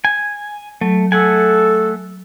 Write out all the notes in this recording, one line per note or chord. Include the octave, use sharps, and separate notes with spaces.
G#5
F#3 A3
A3 A4 F#5 G#5